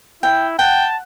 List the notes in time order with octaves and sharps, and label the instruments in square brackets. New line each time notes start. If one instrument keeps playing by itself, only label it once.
[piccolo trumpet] E4 [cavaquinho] G5
[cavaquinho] F#5 [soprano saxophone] G5 [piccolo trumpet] A5